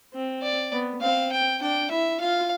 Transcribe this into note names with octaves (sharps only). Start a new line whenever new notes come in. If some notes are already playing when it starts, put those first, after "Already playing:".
C4
D5
B3
C4 F5
G5
D4 G5
E4 E5
F4 F5